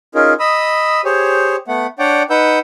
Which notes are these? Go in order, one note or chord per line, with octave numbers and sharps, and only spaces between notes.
C#4 D#4 F4 G#4 A#4
D#5 B5 D#6 E6
G4 G#4 C5 C#5
A3 B3 F#5
D4 C#5 D5 F#5 G5
D#4 B4 F#5 E6 G6